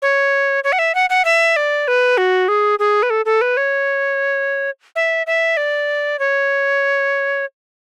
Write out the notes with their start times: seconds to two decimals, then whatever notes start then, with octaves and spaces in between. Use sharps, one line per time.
0.02 C#5
0.64 C#5
0.72 F#5
0.79 E5
0.95 F#5
1.10 F#5
1.25 E5
1.56 D5
1.88 B4
2.18 F#4
2.48 G#4
2.79 G#4
3.03 B4
3.10 A4
3.25 A4
3.41 B4
3.57 C#5
4.96 E5
5.27 E5
5.57 D5
6.19 C#5